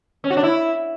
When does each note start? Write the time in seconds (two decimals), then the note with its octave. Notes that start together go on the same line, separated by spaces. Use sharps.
0.24 C#4
0.30 F#4
0.37 D4
0.43 E4